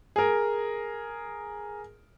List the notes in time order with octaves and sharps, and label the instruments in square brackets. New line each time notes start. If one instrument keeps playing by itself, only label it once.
[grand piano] G#4 A#4